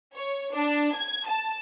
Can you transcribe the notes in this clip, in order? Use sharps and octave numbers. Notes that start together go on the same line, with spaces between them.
C#5
D4
G#6
A5